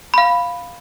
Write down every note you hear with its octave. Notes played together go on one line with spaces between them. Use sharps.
F5 B5